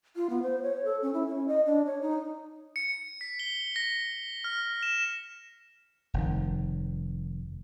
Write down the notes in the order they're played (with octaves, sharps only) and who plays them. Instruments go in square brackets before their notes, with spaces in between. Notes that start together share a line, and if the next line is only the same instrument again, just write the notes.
[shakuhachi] F4
B3
C5
C#5
A4
C#4
E4
C#4
D#5
D4
C#5
D#4
[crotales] C#7
B6
G7
A#6
F6
E7
[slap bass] F1 D#3